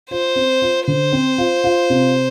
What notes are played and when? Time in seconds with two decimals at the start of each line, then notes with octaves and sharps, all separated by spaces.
0.11 F4 C5
0.36 C4
0.62 F4
0.87 D3 C5
1.13 C4
1.38 F4
1.64 F4
1.90 C3